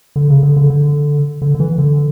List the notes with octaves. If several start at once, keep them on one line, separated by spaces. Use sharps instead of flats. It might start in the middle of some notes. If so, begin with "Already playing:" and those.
D3
C#3
D3
D3
D3
D3
D3
E3
D3